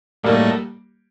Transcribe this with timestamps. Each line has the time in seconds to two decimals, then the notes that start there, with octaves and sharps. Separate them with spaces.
0.23 A2 F#3 G3 A3 A#3 D#4